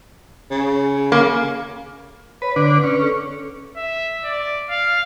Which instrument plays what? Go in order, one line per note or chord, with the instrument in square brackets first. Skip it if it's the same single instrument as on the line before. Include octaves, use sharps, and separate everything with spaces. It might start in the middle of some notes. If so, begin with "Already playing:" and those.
[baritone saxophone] C#3
[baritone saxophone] C#3 [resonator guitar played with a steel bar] A#3
[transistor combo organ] B4 [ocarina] C#5
[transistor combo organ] D3 D4 [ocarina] B4
[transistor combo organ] C#4
[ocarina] A4
[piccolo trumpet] E5
D5
F5